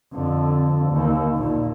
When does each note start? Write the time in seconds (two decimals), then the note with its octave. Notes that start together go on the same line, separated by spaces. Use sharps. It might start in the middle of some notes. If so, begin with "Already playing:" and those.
0.13 F2 D3
0.92 D#2 D#3
1.36 A#1 A#2